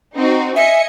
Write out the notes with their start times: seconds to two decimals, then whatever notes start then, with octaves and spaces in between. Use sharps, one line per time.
0.14 C4 D#4 F#4
0.56 D#5 E5 G#5 C#7